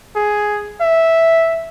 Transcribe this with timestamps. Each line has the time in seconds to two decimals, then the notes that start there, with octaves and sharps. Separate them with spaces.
0.16 G#4
0.81 E5